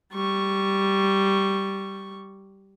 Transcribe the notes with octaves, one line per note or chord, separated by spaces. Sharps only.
G3 C#6